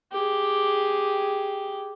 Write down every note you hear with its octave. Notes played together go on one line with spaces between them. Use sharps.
G4 G#4